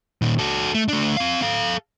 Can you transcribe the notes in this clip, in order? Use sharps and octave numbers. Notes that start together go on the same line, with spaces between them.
A#2 D#3
F#4 A4
A3
A3 D4
C4 F5
A4 F5